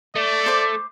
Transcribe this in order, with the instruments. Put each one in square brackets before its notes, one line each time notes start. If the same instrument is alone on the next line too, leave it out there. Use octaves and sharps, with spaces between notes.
[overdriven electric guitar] A3 [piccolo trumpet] D5
[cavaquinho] C5 D6